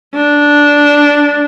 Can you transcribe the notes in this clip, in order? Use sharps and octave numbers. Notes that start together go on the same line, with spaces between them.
D4